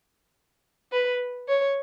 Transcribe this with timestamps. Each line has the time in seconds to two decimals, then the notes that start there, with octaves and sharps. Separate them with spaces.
0.92 B4
1.48 C#5